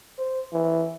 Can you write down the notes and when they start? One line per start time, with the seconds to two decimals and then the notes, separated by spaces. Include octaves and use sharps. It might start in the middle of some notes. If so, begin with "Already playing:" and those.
0.19 C5
0.53 E3